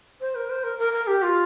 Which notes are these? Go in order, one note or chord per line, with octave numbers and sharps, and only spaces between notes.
C5
A#4
C5
A#4
A#4
A#4
G4
F4